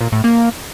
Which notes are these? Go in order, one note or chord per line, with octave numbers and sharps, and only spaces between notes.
A#2
A2
A#3